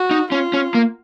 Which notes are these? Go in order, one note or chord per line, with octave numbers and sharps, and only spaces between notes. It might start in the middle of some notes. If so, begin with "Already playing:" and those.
Already playing: F#4
D#4
C#4 F4
C#4
A#3